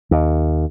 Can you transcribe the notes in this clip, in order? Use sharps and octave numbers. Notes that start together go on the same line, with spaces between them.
D#2